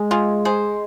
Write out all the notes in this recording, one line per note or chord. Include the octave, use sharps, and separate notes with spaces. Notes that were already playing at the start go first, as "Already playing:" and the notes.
Already playing: G#3
F4 G#4
G#4 C5